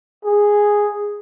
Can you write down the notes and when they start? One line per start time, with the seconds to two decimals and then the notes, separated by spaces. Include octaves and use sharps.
0.25 G#4